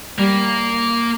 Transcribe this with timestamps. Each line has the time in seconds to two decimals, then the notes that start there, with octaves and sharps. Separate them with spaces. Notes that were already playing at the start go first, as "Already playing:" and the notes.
0.18 G3 A#3